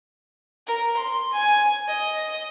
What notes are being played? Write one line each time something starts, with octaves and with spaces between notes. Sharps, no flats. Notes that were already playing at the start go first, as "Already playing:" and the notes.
A#4
C6
G#5
D#5